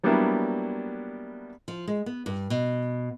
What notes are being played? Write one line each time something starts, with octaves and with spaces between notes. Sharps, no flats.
F#3 G3 A#3 B3 D4 E4
F3
G#3
B3
G2
B2